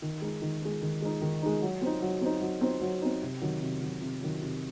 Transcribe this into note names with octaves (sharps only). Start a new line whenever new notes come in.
D#3
G#3 D#4
D#3
G#3 D#4
D#3
G#3 D#4
D#3
G#3 D#4
F#3
C4 D#4
F#3
C4 D#4
F#3
C4 D#4
F#3
C4 D#4
C3
D#3 F#3
C3
D#3 F#3
C3
D#3 F#3
C3